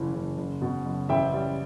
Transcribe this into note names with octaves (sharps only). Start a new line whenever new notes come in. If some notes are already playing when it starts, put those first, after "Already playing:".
Already playing: F#1 E3
F#1
F#1
B2
F#1
A1 E5 G5
G3